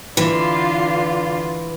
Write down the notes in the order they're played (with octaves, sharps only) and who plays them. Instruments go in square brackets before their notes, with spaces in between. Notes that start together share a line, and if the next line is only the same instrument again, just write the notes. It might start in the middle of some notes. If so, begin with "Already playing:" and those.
[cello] D3 F4 [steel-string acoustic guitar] E3